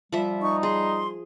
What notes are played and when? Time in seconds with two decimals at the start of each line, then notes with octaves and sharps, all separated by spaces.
0.12 F3 G3 E5
0.42 D#4 C#6
0.63 G#4 C6